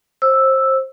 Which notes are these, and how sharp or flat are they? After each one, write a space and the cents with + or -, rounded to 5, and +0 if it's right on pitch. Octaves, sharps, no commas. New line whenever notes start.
C5 +25 E6 +0